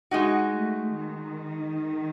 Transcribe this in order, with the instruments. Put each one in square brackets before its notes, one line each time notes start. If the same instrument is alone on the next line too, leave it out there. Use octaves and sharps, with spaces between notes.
[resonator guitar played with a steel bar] G#3 D#4 F#4
[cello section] A3
D#3